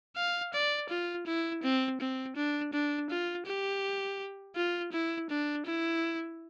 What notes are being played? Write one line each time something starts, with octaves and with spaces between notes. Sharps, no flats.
F5
D5
F4
E4
C4
C4
D4
D4
F4
G4
F4
E4
D4
E4